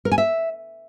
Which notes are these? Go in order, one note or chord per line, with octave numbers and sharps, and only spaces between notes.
A#4
G#5
E5